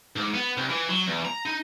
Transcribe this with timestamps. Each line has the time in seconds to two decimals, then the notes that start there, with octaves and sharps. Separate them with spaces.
0.16 G#2
0.34 B3
0.57 C2
0.69 E3
0.88 F#3
1.07 E2
1.25 A#5
1.46 D#4